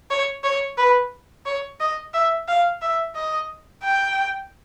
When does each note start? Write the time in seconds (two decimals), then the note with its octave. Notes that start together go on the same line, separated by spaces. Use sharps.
0.11 C#5
0.44 C#5
0.78 B4
1.46 C#5
1.80 D#5
2.14 E5
2.48 F5
2.82 E5
3.16 D#5
3.83 G5